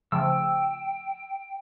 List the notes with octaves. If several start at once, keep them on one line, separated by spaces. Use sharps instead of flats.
C#3 F3 A3 G5 E6